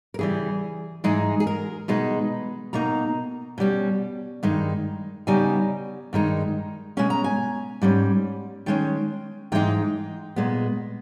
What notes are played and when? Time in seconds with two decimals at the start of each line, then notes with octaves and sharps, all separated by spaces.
0.14 A#4
0.19 C#3 E3 G3 G#4
1.04 G#2 E3 G#3 D#4 G#4
1.40 G#4
1.47 A#4
1.88 B2 G#3 D#4 B4
2.73 B2 A#3 D#4 A#5
3.58 B2 G3 C#4
4.43 G2 D#3 G#3 D#4
5.27 C#3 G3 B3 D#4 G#5
6.13 G2 D#3 G#3 D#4
6.97 B2 G#3 C#4 G#5
7.10 A#5
7.24 G#5
7.82 G#2 G3 C#4
8.66 D#3 G#3 C#4 G5
9.52 G#2 E3 G#3 D#4 G5
10.36 A#2 G#3 B3